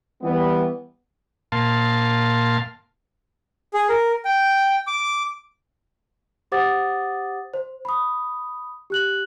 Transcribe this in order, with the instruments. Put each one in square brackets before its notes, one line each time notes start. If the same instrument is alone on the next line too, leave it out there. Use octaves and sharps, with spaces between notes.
[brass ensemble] E3 G3 B3
[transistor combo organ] A#2 F5 A5 C6
[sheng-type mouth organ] G#4
A#4
G5
D6
[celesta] G4 C5 F#5 D6 D#6 A6
C5
B5 D#6
G4 F#6 F#7